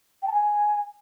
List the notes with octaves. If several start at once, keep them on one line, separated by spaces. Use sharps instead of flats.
G5
A5
G#5